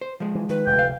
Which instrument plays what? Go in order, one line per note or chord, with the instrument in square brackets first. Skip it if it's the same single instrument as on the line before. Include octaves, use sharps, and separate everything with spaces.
[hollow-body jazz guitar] C5
F3 G#3
[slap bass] E3
[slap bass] D#3 [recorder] B4
[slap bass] F1 D2 [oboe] G5
[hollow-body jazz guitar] F5